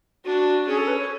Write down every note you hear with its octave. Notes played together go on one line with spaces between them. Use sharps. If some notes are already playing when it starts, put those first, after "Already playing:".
D4 F#4
C#4 G#4
A4
B4
C#5